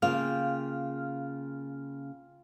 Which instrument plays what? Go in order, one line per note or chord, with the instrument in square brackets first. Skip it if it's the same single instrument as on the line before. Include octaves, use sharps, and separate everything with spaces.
[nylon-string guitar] C#3 A#3 [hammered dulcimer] F4 G5 [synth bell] F5 F6